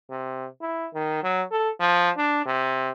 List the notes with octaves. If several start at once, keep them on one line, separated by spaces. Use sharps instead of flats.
C3
E4
D#3
F#3
A4
F3
D4
C3